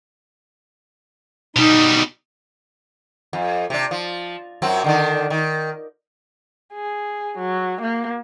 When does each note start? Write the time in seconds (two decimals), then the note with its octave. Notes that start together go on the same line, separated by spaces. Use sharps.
1.56 B2 G3 D#4
3.33 F2
3.70 C3 D4
3.91 F3
4.62 F#2 F#3 C4
4.84 D3 D#3 D4
5.30 D#3
6.74 G#4
7.38 F#3
7.82 A#3